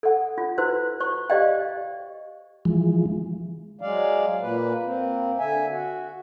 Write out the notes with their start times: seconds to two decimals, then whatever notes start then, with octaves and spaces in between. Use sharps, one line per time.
0.03 A4 F#5
0.38 F4
0.58 E4 F#4 B4 C5
1.00 C5 C#6
1.30 G4 C5 D5 D#5 F5 G5
2.65 E3 F3 G#3
3.81 F#3 G#3 D5 F5
4.41 A#2 A#3 B4
4.84 A#3 C4
5.39 D3 E5 G#5
5.69 F#4